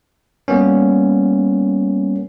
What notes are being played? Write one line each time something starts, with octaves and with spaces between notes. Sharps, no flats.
G3 A#3 B3 C#4